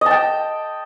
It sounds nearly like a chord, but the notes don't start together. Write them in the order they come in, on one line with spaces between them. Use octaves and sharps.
D#5 A5 G5